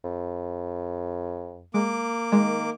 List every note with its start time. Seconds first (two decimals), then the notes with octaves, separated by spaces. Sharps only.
0.04 F2
1.74 G#3 A#3 D6
2.32 D#3 G#3